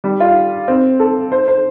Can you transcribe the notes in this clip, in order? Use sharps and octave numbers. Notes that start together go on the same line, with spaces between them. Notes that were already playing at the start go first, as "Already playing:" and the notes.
G3
F4
C4
A4
C5
C5